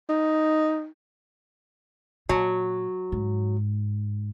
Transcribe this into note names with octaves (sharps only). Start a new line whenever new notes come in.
D#4
A#2 F#3
G#2